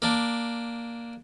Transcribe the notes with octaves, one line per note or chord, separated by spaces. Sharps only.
A#3 D4